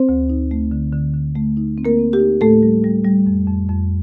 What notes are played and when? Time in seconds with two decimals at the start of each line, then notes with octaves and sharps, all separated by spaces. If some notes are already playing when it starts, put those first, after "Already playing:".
Already playing: C4 C5
0.09 D2
0.30 D#4
0.51 A3
0.72 D3
0.93 D3
1.14 D3
1.36 A3
1.57 D#4
1.78 C4
1.85 A#3 A#4
1.99 C4
2.13 G4
2.20 D#4
2.41 A2 A3 A4
2.63 G3
2.84 G3
3.04 G3
3.27 F2
3.48 F2
3.69 F2